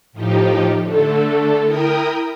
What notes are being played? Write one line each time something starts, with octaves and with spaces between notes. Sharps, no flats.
A2 F3 D#4 G4
D3 A3 A4
E4 A#4 G5 D#6